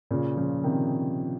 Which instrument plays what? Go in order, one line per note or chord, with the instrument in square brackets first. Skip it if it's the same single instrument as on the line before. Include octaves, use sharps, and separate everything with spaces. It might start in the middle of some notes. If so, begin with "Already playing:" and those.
[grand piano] A#2 C#3
C#3 F3
C3 D#3